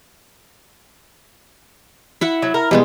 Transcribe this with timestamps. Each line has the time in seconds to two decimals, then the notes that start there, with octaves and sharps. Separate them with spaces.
2.21 E4 E5 F#5
2.42 F#3
2.54 A#4
2.71 B2 G3 G#3 B3